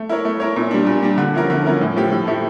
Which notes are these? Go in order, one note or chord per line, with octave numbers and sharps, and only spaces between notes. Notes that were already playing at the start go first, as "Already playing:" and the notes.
Already playing: A3
E4 A#4 C#5
A3
E4 A#4 C#5
A#2
G3 D4
A#2
G3 D4
D3
F3 C#4 E4 A#4
D3
F3 C#4 E4 A#4
A2
F3 A3 E4 G4
A2
F3 A3 E4 G4